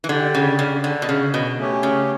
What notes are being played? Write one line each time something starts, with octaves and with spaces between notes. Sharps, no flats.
E3
D3 G4 D5 G5
C#3
C#3
D3
B2
C#3
B2
A3 C#4 G4 C#5
C#3